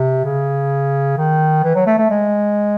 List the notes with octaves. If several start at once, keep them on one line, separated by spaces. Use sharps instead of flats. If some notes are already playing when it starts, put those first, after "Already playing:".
Already playing: C3
C#3
D#3
E3
F#3
A3
A3
G#3